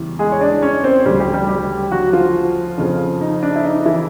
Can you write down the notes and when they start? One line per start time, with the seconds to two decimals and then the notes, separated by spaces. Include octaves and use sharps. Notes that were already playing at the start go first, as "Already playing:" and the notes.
Already playing: E2 C#3 E3 G3
0.19 G#3 G#4
0.32 C#5
0.41 D4 D5
0.62 C#4 C#5
0.84 C4 C5
1.06 D2 C#3 F#3 G3 G4
1.20 G3 G4
1.34 G3 G4
1.49 G3 G4
1.92 F#3 F#4
2.13 F3 F4
2.78 F2 C#3 F3
3.21 D#4
3.43 D4
3.56 E4
3.64 D#4
3.86 E3 E4